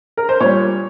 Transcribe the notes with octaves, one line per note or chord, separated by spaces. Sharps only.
A#4
C5
A#2 G3 C#5